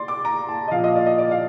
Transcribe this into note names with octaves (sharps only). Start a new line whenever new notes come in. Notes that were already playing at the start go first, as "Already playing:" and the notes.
Already playing: D5 C6
D6
A#5
A5
D#5
A#2 F3 F5
D#5
D5
D#5
D5
F5